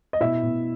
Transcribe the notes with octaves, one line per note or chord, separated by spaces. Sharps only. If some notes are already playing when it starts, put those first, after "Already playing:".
D#5
B2 E4 E5
B2